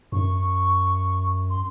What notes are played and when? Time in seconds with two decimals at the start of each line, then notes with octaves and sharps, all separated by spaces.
0.12 F#2 C#6
1.50 C6